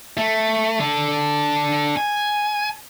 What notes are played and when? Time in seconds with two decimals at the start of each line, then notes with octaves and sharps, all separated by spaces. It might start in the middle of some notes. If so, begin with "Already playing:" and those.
0.18 A3
0.80 D4 A4
1.97 G#5